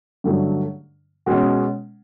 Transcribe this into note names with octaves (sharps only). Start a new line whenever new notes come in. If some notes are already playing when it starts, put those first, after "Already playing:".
G2 D3 F#3 A3
B2 G#3 C#4